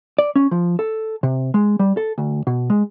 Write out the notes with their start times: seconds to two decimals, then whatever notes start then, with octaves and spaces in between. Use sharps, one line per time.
0.19 D5
0.36 C#4
0.51 F3
0.79 A4
1.23 C3
1.54 G#3
1.79 G3
1.97 A4
2.18 D2
2.47 B2
2.70 G#3